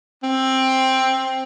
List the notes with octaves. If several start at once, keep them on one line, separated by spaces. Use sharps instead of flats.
C4